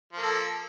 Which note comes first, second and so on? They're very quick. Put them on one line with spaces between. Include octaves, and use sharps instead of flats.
F3 A#3 A4